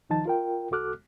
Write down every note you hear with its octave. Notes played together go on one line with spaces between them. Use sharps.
C2 D#3 F3 D#4 A5 A6
F4 A#4 G5
C2 F#4 A4 D6 F6 F#6